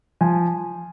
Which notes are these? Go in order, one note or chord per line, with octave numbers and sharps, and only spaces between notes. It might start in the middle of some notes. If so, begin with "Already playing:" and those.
F3 G#5